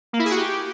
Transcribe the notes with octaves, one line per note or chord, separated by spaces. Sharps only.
A#3
E4
G#4
F#4
G4